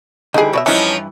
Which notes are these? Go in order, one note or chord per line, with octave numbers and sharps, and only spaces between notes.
D3 E3 G3 D#4 G#4
B2 C#5 D5 E5
G2 E3 F3 C#4 D#4 E4